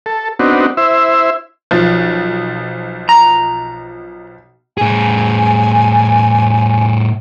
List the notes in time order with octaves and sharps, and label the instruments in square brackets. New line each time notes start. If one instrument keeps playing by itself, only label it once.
[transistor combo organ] A4
B3 C4 D4 D#4 F#4
E4 C5 E5
[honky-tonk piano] B1 F3
[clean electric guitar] A#5
[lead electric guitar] A2 G#4 [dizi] G#5